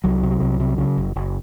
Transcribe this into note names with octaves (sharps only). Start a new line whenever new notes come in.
C2 F#3
C3
C2
C3
C#3
F#1
F#1